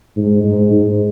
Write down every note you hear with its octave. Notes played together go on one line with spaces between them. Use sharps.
G#2
G#2
G#2